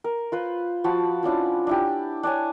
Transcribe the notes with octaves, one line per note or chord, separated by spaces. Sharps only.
A#4
F4 B4 C5
F3 F#4 A5 B5
F3 C#4 D4 E4
D4 E4 G4
D4 C#5 G#5